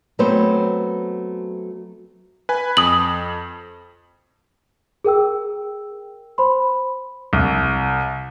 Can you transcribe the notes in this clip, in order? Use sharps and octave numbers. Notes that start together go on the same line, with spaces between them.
F#3 A3 B3 C4 C5
B4 G#5
F2 D#6 F#7
G#4 A#4 G5 E6
C5 B5 C6
C2